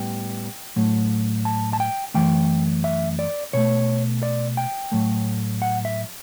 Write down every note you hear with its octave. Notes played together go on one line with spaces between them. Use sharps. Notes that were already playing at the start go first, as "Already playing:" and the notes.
Already playing: A2 G3 B3 G5
A2 F#3 A3
A5
A5
G5
F#2 E3 A3 G5
E5
D5
B2 A3 C#5
D5
G5
A2 F#3 A3
F#5
E5